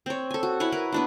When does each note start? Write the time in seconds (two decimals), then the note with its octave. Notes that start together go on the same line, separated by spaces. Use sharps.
0.06 C4 C#5
0.31 A4 G#5
0.43 F#4
0.60 E4 C#5 F#5 G#5
0.72 A#4 B4
0.92 B3 D4 E4